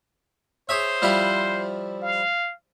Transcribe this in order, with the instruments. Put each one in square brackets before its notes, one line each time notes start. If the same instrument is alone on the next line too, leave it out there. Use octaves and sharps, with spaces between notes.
[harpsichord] G#4 C#5 E5 [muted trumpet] C5
[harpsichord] F3 G3 E4
[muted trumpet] F5